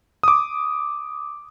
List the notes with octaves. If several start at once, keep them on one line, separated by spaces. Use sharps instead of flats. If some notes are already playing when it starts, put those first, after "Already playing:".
D6 D#6